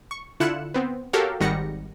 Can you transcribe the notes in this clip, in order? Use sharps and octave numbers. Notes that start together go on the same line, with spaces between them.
C#6
D3 E4 F4 F#6 C#7 E7
B3 C4
F#4 G4 A4 A#4 C#5 F5
G#1 D#3 G3 F#5 A#6 C#7